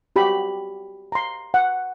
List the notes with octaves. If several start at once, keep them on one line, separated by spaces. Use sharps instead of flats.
F#4 G4 B5
A#5 C6
F#5